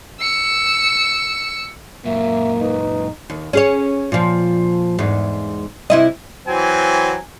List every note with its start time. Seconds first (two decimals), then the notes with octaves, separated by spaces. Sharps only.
0.20 E6 C#7
2.05 F#2 A#2 A#3 E5
2.60 D#4 B4
3.30 D#2
3.53 C#4 G#4 C#5
4.12 A#2 F3
4.99 E2 G#2
5.90 C3 E4 D#5
6.47 E3 F#3 C4 G#5